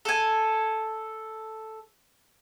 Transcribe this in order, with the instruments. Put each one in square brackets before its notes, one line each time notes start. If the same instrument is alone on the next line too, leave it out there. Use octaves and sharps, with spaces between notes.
[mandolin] A4 G#5